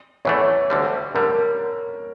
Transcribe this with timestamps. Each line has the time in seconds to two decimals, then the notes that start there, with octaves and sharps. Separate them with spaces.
0.25 E2 E3 A3 C#5
0.70 D2 D3 G3
1.15 D3 G3 A#4